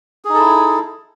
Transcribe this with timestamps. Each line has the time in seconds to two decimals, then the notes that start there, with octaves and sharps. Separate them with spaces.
0.25 G#4
0.29 D#4
0.34 A4
0.39 E4